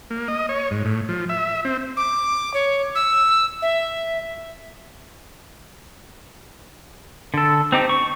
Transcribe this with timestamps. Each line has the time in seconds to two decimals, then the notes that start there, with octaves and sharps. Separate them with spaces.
0.10 A#3
0.28 D#5
0.49 C#5
0.71 G#2
0.85 A2
1.09 F3
1.29 E5
1.65 C4
1.97 D6
2.54 C#5
2.95 E6
3.62 E5
7.34 D3 A4
7.72 C4 D#4 G4
7.89 C#6